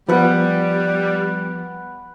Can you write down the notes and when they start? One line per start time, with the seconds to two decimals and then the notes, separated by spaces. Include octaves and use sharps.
0.09 F3 G3 B3 B4 F#5